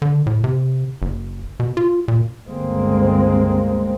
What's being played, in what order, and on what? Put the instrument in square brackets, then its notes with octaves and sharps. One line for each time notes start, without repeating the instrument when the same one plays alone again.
[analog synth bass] D3
A2
C3
F#1
B2
F4
A#2
[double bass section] G1 C#2 D3 G#3 A#3 C4